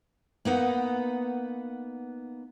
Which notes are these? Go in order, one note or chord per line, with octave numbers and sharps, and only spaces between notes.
A#3 B3 D#4 F#5